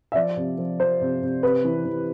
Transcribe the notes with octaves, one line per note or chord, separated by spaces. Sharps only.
E5
F3 D5
C3
F3
F3 C5
C3
C3
C3 B4
E3
E3